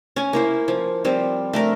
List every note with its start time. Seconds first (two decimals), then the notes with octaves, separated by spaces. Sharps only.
0.16 C#4 G#5
0.33 A#3 E4 C5
0.68 F3
1.05 F3 G3 C4
1.53 A3 D4 A#4